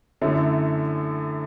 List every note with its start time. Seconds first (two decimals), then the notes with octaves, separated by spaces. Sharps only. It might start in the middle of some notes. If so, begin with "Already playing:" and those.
0.21 F#2 D3 A3 C#4 E4